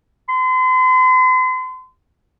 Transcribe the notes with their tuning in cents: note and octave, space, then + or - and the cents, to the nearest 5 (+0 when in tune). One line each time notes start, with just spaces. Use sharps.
C6 -40